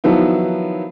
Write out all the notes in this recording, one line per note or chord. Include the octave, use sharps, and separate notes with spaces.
D#3 F3 F#3 B3 D#4 E4